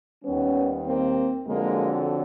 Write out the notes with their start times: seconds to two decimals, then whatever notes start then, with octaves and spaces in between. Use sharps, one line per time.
0.23 D#2 D#3 G3 B3 C#4
0.85 A#3 C4
1.47 F2 D3 F#3 G#3 A#3